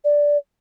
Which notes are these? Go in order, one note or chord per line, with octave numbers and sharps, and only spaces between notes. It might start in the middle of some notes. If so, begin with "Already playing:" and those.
D5